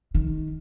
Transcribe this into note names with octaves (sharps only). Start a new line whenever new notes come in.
D#3